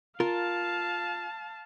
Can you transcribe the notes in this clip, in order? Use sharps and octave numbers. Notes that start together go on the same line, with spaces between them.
F4 A#4 F5 A5